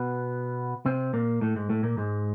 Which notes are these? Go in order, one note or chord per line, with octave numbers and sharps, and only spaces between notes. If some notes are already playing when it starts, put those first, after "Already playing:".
Already playing: B2 B3
C3 C4
A#2 A#3
A2 A3
G#2 G#3
A2 A3
A#2 A#3
G#2 G#3